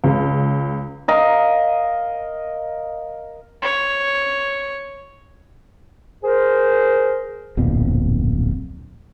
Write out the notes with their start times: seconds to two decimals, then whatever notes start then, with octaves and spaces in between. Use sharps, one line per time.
0.04 C#2
1.08 A#4 D#5 F5
3.62 C#5
6.23 G#4 A#4 C5
7.57 D1 A#1 F2 B2